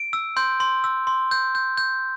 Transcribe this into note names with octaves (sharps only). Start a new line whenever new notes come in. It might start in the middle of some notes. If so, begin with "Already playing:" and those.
Already playing: D7
E6
C6 G6
C6
E6
C6
G6
G6
G6